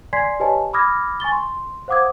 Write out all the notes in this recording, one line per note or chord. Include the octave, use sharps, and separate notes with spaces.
D5 G#5 C6 G#6 B6 C7
G4 B4 C#5 D#5 G#5 A5
B5 D6 D#6 F6 G#6 A#6
G#5 C#6 A6 G7
C6
C5 F5 F#5 D6 D#6 G#6